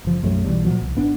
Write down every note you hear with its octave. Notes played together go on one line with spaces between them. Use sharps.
F#1 F3
B1 F#2 F#3 A3
B1 E2 B2 G3
A#2 F3 F#3
C2
G#1 B3 D4